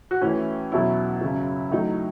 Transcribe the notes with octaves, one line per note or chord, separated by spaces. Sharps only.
F#4
A2 E3 C#4 E4
E2 B2 F#3 C#4 E4
F#2 C#3 F#3
A2 F#3 D#4